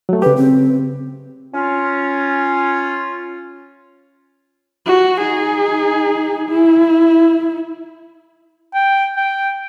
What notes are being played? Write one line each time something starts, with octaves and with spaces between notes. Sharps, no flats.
F#3 A3
C#3 G4 B4
C4
C#4 F4
F#4
D#4 G#4
E4
G5
G5